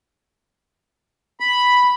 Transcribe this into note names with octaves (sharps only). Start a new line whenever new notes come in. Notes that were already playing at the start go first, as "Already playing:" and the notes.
B5